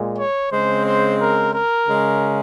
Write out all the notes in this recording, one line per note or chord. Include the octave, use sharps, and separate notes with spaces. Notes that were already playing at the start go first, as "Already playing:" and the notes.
Already playing: A#2 G#3
C#5
C#3 G#3 C4 C5
C5
A#4
A#4
C#3 G#3 C#4